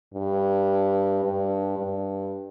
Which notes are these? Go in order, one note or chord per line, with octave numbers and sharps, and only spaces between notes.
G2
G2
G2